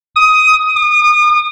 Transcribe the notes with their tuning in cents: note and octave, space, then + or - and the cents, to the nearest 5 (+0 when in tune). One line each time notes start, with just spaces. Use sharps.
D#6 +15
D#6 -35